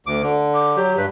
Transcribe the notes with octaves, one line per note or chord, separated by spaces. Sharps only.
D2 D6
D3
D6
F#3 G4
G2 B4